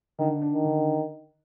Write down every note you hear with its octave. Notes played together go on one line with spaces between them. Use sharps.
D3 D#3
D4
D#3
D3